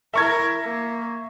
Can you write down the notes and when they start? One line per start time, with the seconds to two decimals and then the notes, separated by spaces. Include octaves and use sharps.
0.14 E4 A#4 E5 C#6 G#6
0.61 A#3